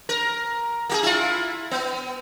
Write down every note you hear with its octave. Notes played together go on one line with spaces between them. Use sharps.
A#4
A#3 F#4 G#4
E4 F4
B3